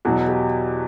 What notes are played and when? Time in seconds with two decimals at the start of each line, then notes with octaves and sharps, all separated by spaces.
0.05 E2 B2 F#3 F#4
0.28 G4